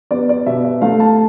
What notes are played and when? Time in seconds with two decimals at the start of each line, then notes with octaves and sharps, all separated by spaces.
0.11 B3 D5
0.29 D5
0.46 B2 E5
0.64 E5
0.82 A3 F5
1.00 A5